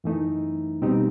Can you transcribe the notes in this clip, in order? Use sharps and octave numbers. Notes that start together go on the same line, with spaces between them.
F#2 E3 A3 D#4
B2 G3 C4 D#4 G4